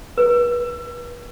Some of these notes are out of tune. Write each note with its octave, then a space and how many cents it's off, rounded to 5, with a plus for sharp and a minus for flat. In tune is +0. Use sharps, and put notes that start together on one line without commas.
B4 -35